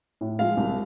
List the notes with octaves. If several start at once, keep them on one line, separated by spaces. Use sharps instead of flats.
A2
F3 G#3 F5
C2